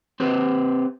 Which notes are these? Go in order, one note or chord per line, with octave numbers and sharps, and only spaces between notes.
C4 G4 B4 C5